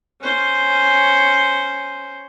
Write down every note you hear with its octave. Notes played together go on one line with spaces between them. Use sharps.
C#4 C5